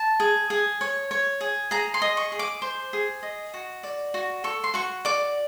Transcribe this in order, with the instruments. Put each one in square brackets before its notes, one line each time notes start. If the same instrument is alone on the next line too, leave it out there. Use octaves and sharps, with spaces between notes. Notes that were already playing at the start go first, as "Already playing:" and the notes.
Already playing: [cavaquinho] A5
G#4
G#4
C#5
C#5
G#4
G#4 A#5
C6
D#5
C#6
G#4
D6
C5
G#4
D#5
F#4
D5
F#4
A4 C#6
C6
F#4 C#6
D5 D6